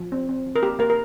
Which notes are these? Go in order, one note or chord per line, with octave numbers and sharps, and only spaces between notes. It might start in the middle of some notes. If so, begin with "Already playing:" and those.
Already playing: F3
C4
C4
F3
A#4
A#3 G4
A#3 A#4
A#4